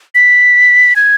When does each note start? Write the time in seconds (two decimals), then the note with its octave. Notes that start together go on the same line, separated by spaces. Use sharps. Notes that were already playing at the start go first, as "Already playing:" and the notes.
0.15 B6
0.96 G#6